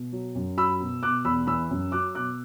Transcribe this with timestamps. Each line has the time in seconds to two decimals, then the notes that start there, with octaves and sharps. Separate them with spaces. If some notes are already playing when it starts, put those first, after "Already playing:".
Already playing: B2
0.12 F#3
0.35 F#2
0.57 F#3 B5 E6
0.80 B2
1.03 B2 D6 F#6
1.25 E2 B5 E6
1.47 E3 B5 E6
1.70 F#2
1.92 F#3 D6 F#6
2.15 B2 D6 F#6